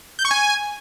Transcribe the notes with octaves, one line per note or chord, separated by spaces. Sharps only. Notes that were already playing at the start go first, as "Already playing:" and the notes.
G6
C#6
G#5